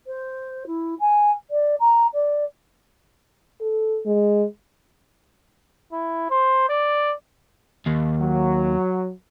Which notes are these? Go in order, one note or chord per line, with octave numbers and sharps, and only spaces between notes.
C5
E4
G#5
D5
A#5
D5
A4
G#3
E4
C5
D5
D#2
F#3